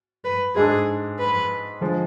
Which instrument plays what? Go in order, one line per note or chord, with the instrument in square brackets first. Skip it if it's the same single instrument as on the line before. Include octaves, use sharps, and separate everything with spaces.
[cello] B4
[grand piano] G#2 G#3 D4 A4 [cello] G#4
[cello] B4
[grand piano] D3 F3 G#3